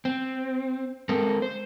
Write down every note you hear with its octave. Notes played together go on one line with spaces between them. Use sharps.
C4
G#3 C4 A4 A#4
C5